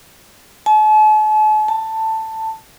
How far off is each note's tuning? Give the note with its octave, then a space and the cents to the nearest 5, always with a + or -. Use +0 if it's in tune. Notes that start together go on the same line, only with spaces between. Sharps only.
A5 -45
A5 +10